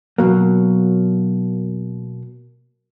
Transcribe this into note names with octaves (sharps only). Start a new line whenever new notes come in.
B2 F#3 A#3